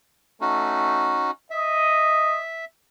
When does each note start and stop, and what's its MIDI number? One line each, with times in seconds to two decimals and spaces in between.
0.41 1.25 57
0.41 1.31 61
0.41 1.31 63
0.41 1.31 66
1.51 2.41 75
1.51 2.65 76